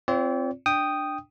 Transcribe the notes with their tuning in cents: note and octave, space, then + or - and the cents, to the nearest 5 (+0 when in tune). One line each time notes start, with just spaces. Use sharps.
C4 +0 F4 -15 D5 -45
D4 +10 G5 +0 D#6 -5